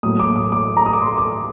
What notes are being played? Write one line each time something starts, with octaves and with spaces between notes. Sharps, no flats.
A2 F#3 A#3 D#6
D6
D#6
D6
A#5
D#6
D6
C6
D6